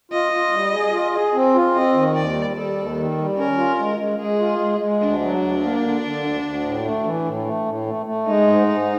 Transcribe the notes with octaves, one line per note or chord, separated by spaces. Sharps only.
F4 D#5
F4
G3
G#4
F4
G#4
C4
F4
C4 D#5
D#3
D#2 D5
G3
G3 A4
D#2
D#3
G3
C#4 A#4
F4
G#3
G#3
G#3 G#4
F4
G#3
G#3
D2 D4
F#3
D2
A#3
D3
D3
D2
D2
A2
A3
E3
A2
A3
A2
A3
A3
G#3 D#4
G#2
G#2